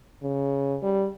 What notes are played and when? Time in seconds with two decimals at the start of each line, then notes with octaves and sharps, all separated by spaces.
0.23 C#3
0.82 G3